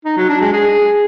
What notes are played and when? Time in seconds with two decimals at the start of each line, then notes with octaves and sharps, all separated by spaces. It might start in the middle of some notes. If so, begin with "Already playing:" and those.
0.05 D#4
0.17 F#3
0.29 D4
0.41 G#3
0.53 G#4